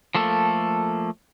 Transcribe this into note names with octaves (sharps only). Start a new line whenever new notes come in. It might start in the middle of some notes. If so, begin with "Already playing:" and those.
F3 A3 A#3 A4